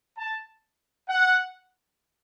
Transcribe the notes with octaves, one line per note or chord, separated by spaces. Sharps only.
A5
F#5